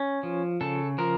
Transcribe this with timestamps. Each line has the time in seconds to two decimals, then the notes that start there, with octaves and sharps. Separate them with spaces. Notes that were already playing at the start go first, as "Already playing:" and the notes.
Already playing: C#4
0.23 F3
0.61 C#3 A4
0.98 F3 A#4